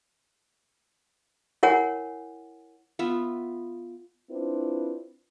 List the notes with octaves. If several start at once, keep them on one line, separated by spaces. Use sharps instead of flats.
E4 A#4 C#5 F#5 G#5
B3 F4 E5
C4 D4 E4 F4 B4 C5